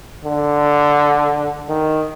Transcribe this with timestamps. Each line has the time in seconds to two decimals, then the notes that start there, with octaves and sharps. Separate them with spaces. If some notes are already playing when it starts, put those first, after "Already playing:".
0.25 D3
1.69 D#3